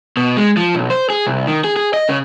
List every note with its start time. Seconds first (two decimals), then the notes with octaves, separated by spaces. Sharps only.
0.17 B2
0.37 G#3
0.57 F3
0.75 B1
0.90 C5
1.10 G#4
1.27 C2
1.47 D#3
1.64 G#4
1.76 G#4
1.94 D#5
2.09 C#3